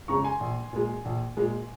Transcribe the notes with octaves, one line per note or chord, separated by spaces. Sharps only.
F2 C#3 G#3 A#5 C#6
G#5 C6
A#1
A#2 G#3
A#1
A#2 G#3